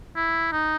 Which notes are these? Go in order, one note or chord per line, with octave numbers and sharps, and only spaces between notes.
E4
D#4